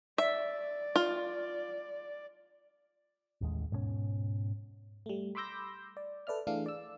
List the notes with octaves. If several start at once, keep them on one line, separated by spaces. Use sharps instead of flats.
D5 E5
F4
A1 D#2 G#3
G#2 B2 B3 C#4
G3 A3
B5 C6 D6 E6 G6 A#6
D5
A4 B4 D5 E5 F6
E3 A3 D4 G#4 F5
D5 E6